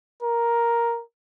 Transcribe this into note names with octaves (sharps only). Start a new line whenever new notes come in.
A#4